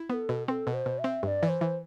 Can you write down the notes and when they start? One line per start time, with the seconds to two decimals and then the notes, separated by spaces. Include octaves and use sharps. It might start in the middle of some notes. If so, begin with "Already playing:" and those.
Already playing: E4
0.10 B3 B4
0.14 A4
0.29 B2
0.48 C4 A4 B4
0.67 B2
0.73 C5
0.86 B2
0.99 E5
1.04 C4
1.23 G2 E5
1.28 D5
1.43 E3
1.49 C5
1.61 E3